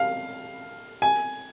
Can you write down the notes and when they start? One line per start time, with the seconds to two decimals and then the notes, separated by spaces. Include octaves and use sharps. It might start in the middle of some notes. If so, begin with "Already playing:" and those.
Already playing: F5
1.02 G#5